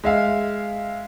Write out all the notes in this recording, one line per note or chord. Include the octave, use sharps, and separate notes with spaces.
G#3 E5 F5